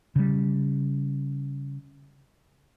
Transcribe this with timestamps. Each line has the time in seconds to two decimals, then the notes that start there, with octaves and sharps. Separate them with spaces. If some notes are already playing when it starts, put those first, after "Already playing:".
0.16 C#3 G3